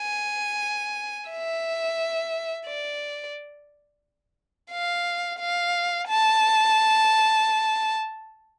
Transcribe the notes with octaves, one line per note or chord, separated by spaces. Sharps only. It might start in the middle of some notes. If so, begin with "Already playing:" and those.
Already playing: G#5
E5
D5
F5
F5
A5